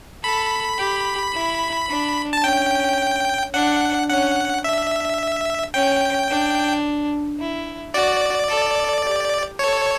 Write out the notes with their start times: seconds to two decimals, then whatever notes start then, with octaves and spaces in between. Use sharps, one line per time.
0.23 A4 B5
0.78 G4
1.33 E4
1.89 D4
2.33 A5
2.43 C#4 G5
3.54 D4 F#5
4.09 C#4 F#5
4.64 D4 E5
5.74 C#4 G5
6.30 D4
7.39 E4
7.94 F#4 D5
8.49 A4
9.04 G4
9.59 A4 C#5